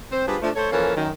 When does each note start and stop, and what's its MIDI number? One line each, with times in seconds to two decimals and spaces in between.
0.11 0.24 60
0.11 0.24 72
0.26 0.36 55
0.26 0.36 62
0.26 0.36 65
0.26 0.36 68
0.26 0.36 71
0.26 0.36 72
0.41 0.50 53
0.41 0.50 57
0.41 0.50 62
0.55 0.70 57
0.55 0.70 69
0.55 0.70 72
0.55 0.70 73
0.71 0.92 52
0.71 0.92 53
0.71 0.92 58
0.71 0.92 61
0.71 0.92 69
0.71 0.92 70
0.96 1.09 42
0.96 1.09 51